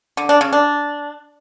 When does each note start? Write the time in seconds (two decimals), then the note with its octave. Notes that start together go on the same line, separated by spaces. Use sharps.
0.17 D3
0.29 D4
0.41 C#3
0.53 D4